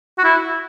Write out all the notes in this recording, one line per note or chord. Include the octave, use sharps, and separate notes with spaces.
F#4
E4